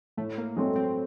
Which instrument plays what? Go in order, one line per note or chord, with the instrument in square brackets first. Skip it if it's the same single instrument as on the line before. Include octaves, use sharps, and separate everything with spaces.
[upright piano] A2 [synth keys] A3
[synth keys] A#3
[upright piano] F#3 A3 C4 [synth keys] G#3
[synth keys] C4